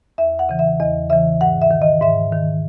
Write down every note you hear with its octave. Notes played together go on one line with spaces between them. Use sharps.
E2 E5
F#5
C#3 E3
E5
E2 D#5
C#3 E3 E5
G#2 F#5
E5
D#3
D#5
G#2 E5
D#3